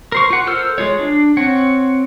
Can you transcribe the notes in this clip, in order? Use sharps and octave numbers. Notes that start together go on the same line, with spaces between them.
A#4 C5 C#6
F4 F#5
A4 A#4 C5 E6 F6
G#3 F4 C#5
D4
C4 C#5 F#5